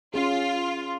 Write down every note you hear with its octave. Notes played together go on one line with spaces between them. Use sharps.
C#4 F4 G#4